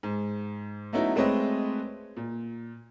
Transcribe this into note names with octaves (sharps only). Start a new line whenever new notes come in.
G#2
F#3 A3 B3 C#4 D#4 E4
G#3 A3 C4 B4 C#5 D#5
A#2